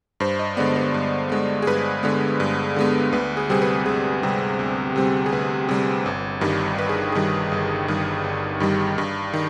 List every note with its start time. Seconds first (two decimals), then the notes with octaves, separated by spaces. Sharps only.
0.20 G2 C5
0.39 D#5
0.57 D3 G#3 B3 D5
0.76 C5
0.94 G2
1.30 D3 G#3 B3
1.62 G#4
1.67 G2 B4
2.03 D3 G#3 B3
2.40 G2
2.76 D3 G#3 B3
3.12 D2 B4
3.37 G#4
3.50 C3 G3 C4 G#4
3.62 B4
3.86 D2 G#4
4.23 C3 G3 C4
4.59 D2
4.96 C3 G3 C4
5.26 G#4
5.32 D2 B4
5.69 C3 G3 C4
6.06 G1
6.41 G2 D#3 G3
6.78 G1 B4
6.89 G#4
7.12 G2 D#3 G3 G#4
7.52 G1
7.88 G2 D#3 G3
8.24 G1
8.60 G2 D#3 G3
8.98 G2
9.34 D#3